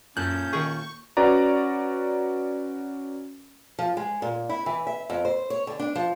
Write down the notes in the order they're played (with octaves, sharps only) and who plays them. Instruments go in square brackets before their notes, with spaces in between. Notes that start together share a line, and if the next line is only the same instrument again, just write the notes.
[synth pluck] F#2 F#6 [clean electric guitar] A#2 A4 [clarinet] C#4 [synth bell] G6
[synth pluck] D#3 G#4 [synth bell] C#6
[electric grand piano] C#4 F#4 B4 D5 A#5
[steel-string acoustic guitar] F3
G#3
A#2
E4
E3
E5
F2
C5
C#5
D3
D4
F3